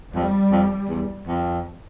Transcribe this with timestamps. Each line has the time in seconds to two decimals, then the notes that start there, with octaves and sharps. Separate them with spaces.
0.14 F2 G3
0.51 F2
0.89 E2
1.27 F2